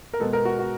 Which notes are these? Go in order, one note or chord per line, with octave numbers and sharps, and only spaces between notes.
A#4
B2 G#3 A4
A#4
F#4
F#4